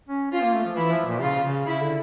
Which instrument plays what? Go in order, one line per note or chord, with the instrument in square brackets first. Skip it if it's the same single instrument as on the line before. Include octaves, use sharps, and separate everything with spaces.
[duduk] C#4
[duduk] C#4 [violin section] F4
[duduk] A#3
A3
F3
[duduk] E3 [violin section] E4
[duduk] F3
A#2
[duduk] C#3 [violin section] F4
[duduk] C#3
[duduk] C#3 [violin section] E4
[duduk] D3